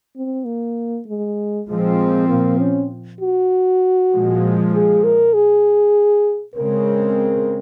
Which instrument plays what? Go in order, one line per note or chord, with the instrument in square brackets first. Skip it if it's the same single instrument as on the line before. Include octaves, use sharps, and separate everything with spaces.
[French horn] C4
A#3
G#3
[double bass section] A#2 F3 C4 [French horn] G#3
[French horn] A#3
C#4
F#4
[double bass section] A#2 F3 G#3
[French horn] G#4
A#4
G#4
[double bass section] C#3 G#3 C4 [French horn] A#4